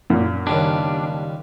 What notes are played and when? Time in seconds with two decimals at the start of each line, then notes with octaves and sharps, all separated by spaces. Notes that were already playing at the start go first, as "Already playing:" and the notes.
0.10 F#2 A#2
0.47 D#2 C#3 G3 D4